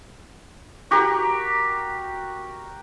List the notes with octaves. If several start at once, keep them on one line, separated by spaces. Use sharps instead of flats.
F#4 G4 A#4